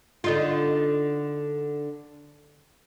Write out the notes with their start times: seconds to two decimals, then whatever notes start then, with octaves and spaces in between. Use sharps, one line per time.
0.24 D3 D#4 F4